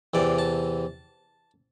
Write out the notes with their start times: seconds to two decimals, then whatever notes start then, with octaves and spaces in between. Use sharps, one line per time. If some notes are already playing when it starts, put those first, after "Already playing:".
0.14 E2 C3 E3 D5
0.39 A5